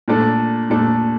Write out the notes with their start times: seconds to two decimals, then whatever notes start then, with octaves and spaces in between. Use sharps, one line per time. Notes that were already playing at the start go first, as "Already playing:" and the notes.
0.08 A#2 A3 D4 A4
0.70 A#2 A3 D4 A4